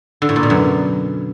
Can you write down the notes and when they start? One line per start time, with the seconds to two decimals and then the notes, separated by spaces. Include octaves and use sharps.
0.22 D3
0.29 A2
0.36 A#2
0.43 B2
0.50 F#2